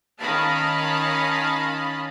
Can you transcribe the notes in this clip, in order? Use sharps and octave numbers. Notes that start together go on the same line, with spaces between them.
D#3 C#4 D#5 F5 A5 B5